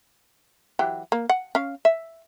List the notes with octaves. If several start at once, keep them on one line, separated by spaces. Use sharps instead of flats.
E3 F#3 G4
A#3
F#5
C#4 F5
E5